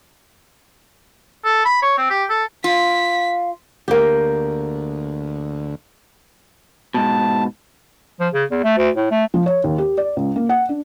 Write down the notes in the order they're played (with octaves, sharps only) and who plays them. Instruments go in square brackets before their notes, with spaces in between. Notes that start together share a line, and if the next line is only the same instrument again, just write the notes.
[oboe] A4
B5
C#5
C4
G4
A4
[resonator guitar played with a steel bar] F4 [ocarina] F5 [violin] B6
[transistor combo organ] D2 [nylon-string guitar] A#3 G4
[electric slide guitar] G#2 B2 [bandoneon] A5
[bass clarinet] F3
C#3
E2
A3
D2
A2
A3
[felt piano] F3
C#5
D#2
G4
D5
C#2
A#3
F#5
D4